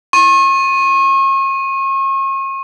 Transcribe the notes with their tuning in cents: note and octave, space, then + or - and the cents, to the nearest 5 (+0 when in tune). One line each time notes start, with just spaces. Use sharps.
C#6 -40